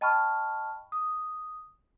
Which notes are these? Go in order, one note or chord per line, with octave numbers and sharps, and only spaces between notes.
D#5 G5 A5 B5 C#6 F6
D#6